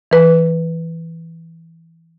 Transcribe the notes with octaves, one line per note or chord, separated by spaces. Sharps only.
E3 B4